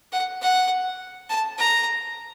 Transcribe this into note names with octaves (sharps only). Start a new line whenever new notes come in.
F#5
F#5
A5
A#5